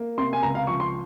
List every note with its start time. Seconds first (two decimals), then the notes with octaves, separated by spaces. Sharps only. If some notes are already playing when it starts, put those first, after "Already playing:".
Already playing: A#3
0.18 C3 C6
0.33 G#5
0.43 C#2 A#5
0.55 F5
0.67 F3 C#6
0.80 C6